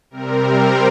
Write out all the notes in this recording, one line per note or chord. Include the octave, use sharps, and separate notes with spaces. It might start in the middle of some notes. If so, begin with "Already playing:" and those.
C3 G3 C4 A#4
C5